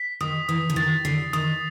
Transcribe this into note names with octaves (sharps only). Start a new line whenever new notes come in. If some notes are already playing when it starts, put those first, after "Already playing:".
Already playing: B6
D#3 D#6
E3 D#6
D3
D#3 A6
D3 C7
D#3 D#6